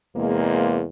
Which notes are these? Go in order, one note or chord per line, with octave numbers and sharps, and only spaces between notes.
E2 C3 G#3 A#3